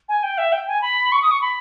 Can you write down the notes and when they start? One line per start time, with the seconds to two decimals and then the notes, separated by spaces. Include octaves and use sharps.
0.09 G#5
0.23 G5
0.38 E5
0.52 G5
0.68 G#5
0.82 B5
1.12 C#6
1.22 D#6
1.31 C#6
1.42 B5